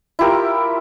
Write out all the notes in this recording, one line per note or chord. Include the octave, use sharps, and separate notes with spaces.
E4 F4 G4 A#4